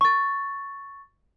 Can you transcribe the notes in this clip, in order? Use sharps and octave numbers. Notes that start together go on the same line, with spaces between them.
C#6 A6